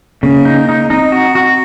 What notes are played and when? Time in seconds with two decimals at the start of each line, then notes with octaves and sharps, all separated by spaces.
0.23 C#3 A#3
0.45 D#4
0.69 D#4
0.90 C4 D#4
1.12 F#4
1.35 F#4